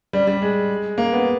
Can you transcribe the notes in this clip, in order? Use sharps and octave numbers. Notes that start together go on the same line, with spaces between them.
G3
G3
G#3
A#3
B3